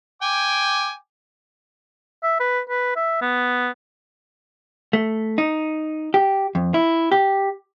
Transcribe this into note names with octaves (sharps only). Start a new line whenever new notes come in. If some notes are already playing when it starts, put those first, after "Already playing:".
G5 G#5 D6
E5
B4
B4
E5
B3
A3
D#4
G4
F2
E4
G4